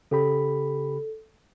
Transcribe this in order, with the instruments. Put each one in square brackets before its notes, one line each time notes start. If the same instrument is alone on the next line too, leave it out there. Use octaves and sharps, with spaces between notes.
[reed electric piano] C#3 G4 B5 [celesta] A4